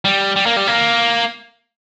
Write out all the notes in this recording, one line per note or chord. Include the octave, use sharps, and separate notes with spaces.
G3
G3
A#3
G3
A#3